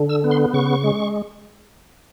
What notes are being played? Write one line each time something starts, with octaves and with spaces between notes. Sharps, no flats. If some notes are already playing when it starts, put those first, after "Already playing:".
Already playing: D3
E6
B3
C6
C#3 C#6
G#3